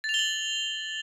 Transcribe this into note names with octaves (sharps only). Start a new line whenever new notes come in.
A6
F7
G7
F#7